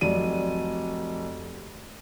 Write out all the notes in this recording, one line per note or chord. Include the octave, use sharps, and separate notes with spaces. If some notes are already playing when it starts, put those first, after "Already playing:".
F1 F#3 D5 D#7